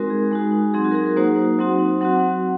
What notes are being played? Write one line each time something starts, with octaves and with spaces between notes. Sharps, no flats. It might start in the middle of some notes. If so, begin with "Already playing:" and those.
Already playing: G#3 C4 D#4 F#4 A#4
G#4
G#3 D#4 F#4
F#3 C4 D#4 G#4
F#4
A#4
G#4
A#4
F#3 A#3 D#4 F#4 C5
F#3 C4 D#4 F#4
F#3 C4 F#4 F#5